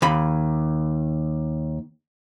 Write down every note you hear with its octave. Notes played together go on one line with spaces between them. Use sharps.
D#2 B5